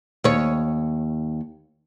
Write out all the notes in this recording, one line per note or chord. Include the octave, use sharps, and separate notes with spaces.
D#2 C#5